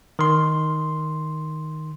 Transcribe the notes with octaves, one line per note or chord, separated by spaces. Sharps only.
D#3 C6